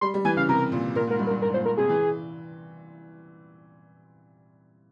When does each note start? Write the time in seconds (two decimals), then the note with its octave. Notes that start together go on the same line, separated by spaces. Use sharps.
0.01 G3 C6
0.14 G3
0.25 E3 G#5
0.36 C#3 F5
0.49 C3 A#4
0.72 A#2
0.95 A#2 A#4
1.07 G#2 A#4
1.19 G2
1.27 A#4
1.31 G2
1.42 G#2 A#4
1.54 A#2 C5
1.65 A#2 A#4
1.77 C3 G#4
1.89 E3